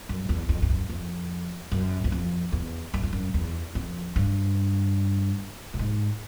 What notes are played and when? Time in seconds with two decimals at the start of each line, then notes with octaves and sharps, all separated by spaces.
0.09 F#2
0.29 E2
0.49 F2
0.62 F2
0.70 F#2
0.90 F2
1.72 F#2
2.04 E2
2.12 F2
2.52 E2
2.94 F#2
3.03 F2
3.13 F#2
3.34 E2
3.75 F2
4.16 G2
5.74 A2
5.79 G#2